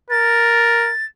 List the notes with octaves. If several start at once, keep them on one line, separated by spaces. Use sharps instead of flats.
A#4 A6